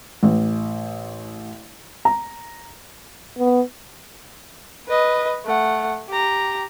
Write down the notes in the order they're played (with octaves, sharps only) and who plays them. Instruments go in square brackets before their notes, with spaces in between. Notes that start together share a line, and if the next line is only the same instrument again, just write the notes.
[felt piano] A1
A#5
[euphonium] B3
[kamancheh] B4 D#5
A3 F#5
G4 A#5